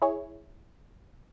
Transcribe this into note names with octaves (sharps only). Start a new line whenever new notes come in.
E4 G#4 C#5